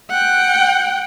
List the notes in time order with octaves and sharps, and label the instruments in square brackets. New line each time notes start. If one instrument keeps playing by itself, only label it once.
[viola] F#5 G5